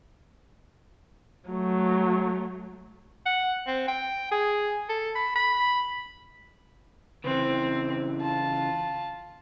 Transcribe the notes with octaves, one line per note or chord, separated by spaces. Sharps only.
F#3 A3
F#5
C4
G5
G#4
A4
B5
B5
C#3 E3 C4
F4 A5